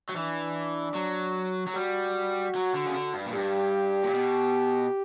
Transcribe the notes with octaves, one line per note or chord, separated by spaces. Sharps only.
F#3
E3 D4
F#3
F#3
G3 F#4
F#3
D3
C#3
D3
G2
A#2
G2 G4
A#2
B2